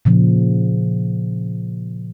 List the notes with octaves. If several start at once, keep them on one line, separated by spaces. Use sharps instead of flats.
A#2 C#3 F3